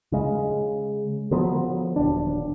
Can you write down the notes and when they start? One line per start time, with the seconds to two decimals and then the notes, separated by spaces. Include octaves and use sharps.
0.12 C#3 G#3
1.31 D3 F3 F#3 B3
1.96 D#1 D4